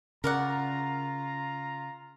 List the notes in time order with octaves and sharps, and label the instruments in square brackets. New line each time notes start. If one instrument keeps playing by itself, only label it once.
[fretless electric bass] C#3 [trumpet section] F4 A#5 [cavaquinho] A#4 D5 F#5